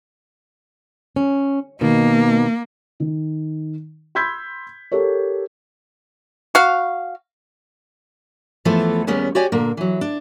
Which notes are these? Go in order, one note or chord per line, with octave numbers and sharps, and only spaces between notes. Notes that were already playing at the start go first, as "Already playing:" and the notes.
C#4
B2 D#3 A#3
D#3
B5 C6 E6 G6 G#6 B6
G4 A4 A#4 C#5
F#4 F5
E2 E3 F3 A3 B3 A4
D#2 G3 G#3 B3 C#4
F#4 G4 C#5 D5 G5 G#5
A#2 D3 A#3
E3 F#3
D4